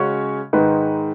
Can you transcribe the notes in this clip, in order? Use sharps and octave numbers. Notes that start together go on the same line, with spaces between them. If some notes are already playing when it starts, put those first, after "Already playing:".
Already playing: C#3 G#3 C#4 F#4 C#5
G#2 D#3 G#3 D#4 B4